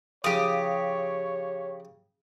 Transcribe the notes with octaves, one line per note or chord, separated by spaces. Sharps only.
C#3 F3 G4 C#5 D#6